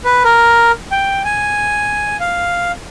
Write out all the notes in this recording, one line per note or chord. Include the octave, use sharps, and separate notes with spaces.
B4
A#4
G5
G#5
F5